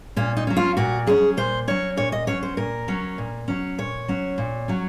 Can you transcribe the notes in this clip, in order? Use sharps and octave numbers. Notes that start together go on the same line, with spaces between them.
A#2 C#4
D#4
F#3 C#4
F4
A#2 F#4
F#3 C#4 G#4
A#2 C5
F#3 C#4 C#5
A#2 C#5
D#5
F#3 C#4 C#5
C5
A#2 A#4
F#3 C#4
A#2
F#3 C#4
A#2 C#5
F#3 C#4
A#2
F#3 C#4